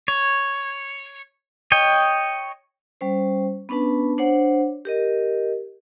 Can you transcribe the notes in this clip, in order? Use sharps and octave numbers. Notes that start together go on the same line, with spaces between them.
C#5
C#5 D#5 G5
G3 C#4 C5
B3 C#4 D4 B4 A5
D4 C5 C#5 F#5
G4 A#4 D#5